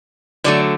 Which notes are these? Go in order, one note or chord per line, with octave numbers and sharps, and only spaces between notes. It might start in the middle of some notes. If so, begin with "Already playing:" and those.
D3 F#3 A3 D5